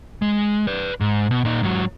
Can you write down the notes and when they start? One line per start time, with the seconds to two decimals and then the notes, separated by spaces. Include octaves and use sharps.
0.22 G#3
0.67 B4 D5
1.00 G#2
1.31 B2
1.45 A#2 D#4
1.63 G#2 F#3